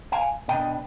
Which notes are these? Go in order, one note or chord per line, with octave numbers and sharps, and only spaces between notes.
F5 G#5
B2 B3 D4 D#5 G5